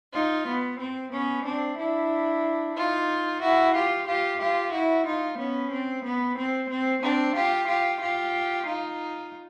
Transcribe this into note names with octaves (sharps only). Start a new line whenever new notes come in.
D#4 F4
B3
C4
B3 C#4
C4 D4
D4 E4
D#4 F4
E4 F#4
F4 G4
F4 G4
F4 G4
E4 F#4
D#4 F4
B3 C#4
C4
B3
C4
C4
C4 D4
F4 G4
F4 G4
F4 G4
D#4 F4